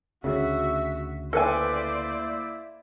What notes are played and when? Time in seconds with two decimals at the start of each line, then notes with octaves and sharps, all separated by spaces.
0.24 D2 C#3 F#4 E5
1.33 A#3 E4 A4 B4 C5 D5 E5 G#5